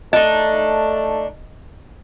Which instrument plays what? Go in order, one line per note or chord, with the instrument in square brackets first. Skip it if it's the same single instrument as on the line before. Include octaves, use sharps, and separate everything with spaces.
[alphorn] A3 [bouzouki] D4 D#4 [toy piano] D#5